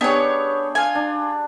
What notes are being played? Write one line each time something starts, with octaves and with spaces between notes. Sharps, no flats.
B3 D4 G4 G#4 C#5
F4 G#5
D4